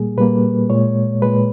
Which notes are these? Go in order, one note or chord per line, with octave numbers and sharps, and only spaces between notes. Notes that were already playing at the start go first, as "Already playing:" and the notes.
Already playing: A#2 G3 A#3 G#4
A#2 G3 A#3 B4
A#2 G#3 C#5
A#2 G#3 B4